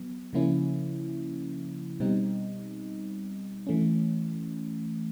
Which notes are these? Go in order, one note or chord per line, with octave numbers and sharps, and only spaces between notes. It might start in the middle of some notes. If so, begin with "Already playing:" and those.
Already playing: F#3 B3
C#3 F3 A#3 C#4 E4
B2 G3 C4 D#4
E3 A3 C#4